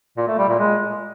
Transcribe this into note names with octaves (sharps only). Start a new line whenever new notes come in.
A#2
A3
G3
A#2
G#3